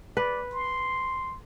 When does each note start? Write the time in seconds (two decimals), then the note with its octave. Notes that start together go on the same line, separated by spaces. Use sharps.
0.17 B4 D5
0.53 C6